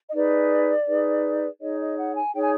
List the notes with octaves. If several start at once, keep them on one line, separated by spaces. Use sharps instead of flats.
D#5
D#4 G#4 B4 D5
D#4 G#4 B4
D#4 G#4 C#5 D#5
D#5
F#5
G#5
D#4 G#4 C#5 G5
G#5